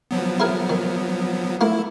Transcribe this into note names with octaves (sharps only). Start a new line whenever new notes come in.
F3 F#3 B3
E4 G#4 A#4
D#3
A3 A#3 E4